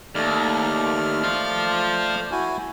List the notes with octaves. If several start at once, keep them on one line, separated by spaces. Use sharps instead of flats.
D#2 A3 D5 F6
C5 F5
E4 F#4 G#5